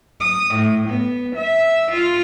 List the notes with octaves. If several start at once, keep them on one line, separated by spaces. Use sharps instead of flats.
D#6
A2
B3
E5
F4